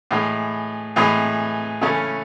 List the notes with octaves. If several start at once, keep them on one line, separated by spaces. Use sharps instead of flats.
A2 E3 G#3
A2 E3 G#3
C#3 E3 A3 C#4